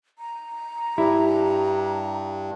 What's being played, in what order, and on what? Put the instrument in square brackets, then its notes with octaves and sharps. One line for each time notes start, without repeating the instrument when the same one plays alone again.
[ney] A#5
[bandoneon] G2 [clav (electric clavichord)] E4 [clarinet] G4